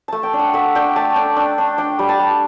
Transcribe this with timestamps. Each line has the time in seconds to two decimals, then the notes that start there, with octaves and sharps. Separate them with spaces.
0.08 A3 A5
0.23 G5
0.33 D4
0.39 F#5
0.54 A3 E5
0.75 D4 G5
0.96 A3 A5
1.16 D4 G5
1.36 D4
1.58 D4
1.78 D4 G5
1.99 G3
2.09 A5
2.19 G3